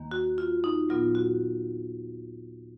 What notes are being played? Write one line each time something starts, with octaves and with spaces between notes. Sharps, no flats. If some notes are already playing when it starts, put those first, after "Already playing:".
Already playing: D#2 D#3 A#3
F#4
F4
D#4
A#2 F#3 B3 F4
F#4